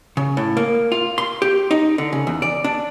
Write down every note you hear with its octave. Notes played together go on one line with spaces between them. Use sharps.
C#3
A2
A#3
F4
C6
G4
D#4
D3
C#3
E2
D5
D4